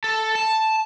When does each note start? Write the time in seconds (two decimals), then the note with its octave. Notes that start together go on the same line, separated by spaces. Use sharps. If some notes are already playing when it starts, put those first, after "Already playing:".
0.04 A4
0.35 A5